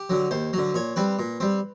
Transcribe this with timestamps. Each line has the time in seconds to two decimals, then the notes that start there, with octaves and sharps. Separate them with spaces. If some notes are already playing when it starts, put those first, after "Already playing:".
Already playing: G4
0.10 D3 F#3
0.31 D#2 C5
0.53 D3 F#3
0.74 A#2 C#5
0.96 G3 C4 B4
1.19 A#2
1.40 G3 C4